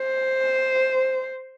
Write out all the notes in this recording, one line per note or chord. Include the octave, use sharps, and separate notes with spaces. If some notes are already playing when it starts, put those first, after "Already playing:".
Already playing: C5